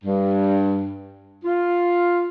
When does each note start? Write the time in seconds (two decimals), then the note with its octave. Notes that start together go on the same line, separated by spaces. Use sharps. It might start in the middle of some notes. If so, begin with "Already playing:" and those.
0.04 G2
1.45 F4